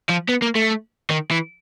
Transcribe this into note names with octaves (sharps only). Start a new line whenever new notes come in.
F3
B3
A#3
A3
D#3
E3